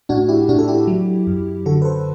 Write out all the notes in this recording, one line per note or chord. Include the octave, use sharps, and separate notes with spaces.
A2 D4 F#4
E4 G4
A2 D4 F#4
A4
E4 G4
F#3
F#2
D3 F#4 A4
B4
A4 C5